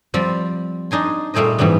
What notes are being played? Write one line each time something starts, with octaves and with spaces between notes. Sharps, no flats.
F3 G3 C4
D4 D#4 G#5 C6
A#2 G3 A3 G#4 C5 D#5
G#2 E3 F#3 G3 B3